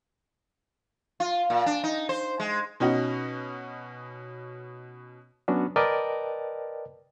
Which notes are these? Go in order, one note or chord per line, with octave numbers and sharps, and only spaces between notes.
F4
A#2
D4
D#4
C5
G#3
B2 C#4 D#4 F#4
F#3 B3 C#4 D4 F#4
A#4 B4 D5 D#5 G5 A5